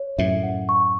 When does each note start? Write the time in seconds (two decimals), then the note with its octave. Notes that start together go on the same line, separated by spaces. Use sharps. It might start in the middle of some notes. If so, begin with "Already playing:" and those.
Already playing: C#5
0.18 F#2 A2 E5
0.43 F#5
0.69 C#6